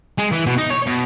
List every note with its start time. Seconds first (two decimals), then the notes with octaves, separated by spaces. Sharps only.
0.18 G#3
0.32 E3
0.46 B2
0.58 D#4
0.70 C#5
0.87 B2